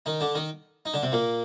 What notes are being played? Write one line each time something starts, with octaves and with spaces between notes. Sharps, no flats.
D#3 D#4
D3 D4
D#3 D#4
D#4
D3 D4
C3 C4
A#2 A#3